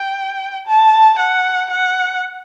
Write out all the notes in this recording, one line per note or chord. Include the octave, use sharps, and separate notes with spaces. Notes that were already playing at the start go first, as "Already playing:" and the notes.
Already playing: G5
A5
F#5
F#5